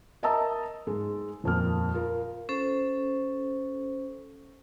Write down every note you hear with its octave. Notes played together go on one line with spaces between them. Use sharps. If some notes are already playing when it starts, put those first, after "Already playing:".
A#4 D#5 E5 A5 A#5 E6
G#2 G#3
D#1 F2 A#3 F6
F4 A#4
C#4 A4 C5